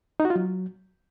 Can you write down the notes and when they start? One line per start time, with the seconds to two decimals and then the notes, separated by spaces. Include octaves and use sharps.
0.20 D#4
0.25 F#4
0.30 F4
0.36 F#3